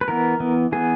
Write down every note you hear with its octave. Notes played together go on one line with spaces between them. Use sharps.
B4
E3 B3 A#4
E3 B3
E3 B3 G#4